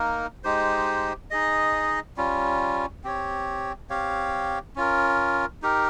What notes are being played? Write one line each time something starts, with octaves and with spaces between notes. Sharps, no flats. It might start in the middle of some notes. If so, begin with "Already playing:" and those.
Already playing: A#3 D#4 A#4
G#3 D#4 G4 C5
D#4 G#4 D#5
G3 C#4 F4
C4 G4 C#5
C4 G4 C#5 F5
C#4 F4 A#4
D#4 G4 A#4